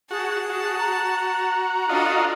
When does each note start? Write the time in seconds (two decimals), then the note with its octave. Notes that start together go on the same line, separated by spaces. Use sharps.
0.11 F#4 G#4 A5
0.50 F#4
0.78 A#5
1.89 D4 F4 F#4 A4 D#5